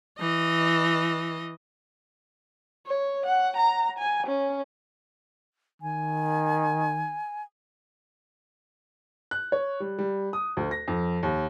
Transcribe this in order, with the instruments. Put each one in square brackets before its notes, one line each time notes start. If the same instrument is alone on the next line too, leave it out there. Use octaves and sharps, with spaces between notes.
[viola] E3 D#5
[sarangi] C#5
F#5
A#5
G#5
C#4
[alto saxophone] D#3 [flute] G#5
[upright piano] F#6
C#5
G3
G3
D#6
D2
A#6
F2
D#2